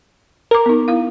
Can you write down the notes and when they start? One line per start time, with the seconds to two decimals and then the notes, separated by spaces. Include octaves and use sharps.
0.51 A#4 A#5 D6
0.66 B3 D#4
0.88 E4 F5